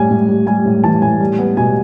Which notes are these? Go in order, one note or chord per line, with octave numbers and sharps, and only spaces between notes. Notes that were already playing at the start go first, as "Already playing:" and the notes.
Already playing: A2 G3 G#5
A2
G3
G3 G#5
A2
E3 A5
A2 G#5
G3
B3
B2 G#5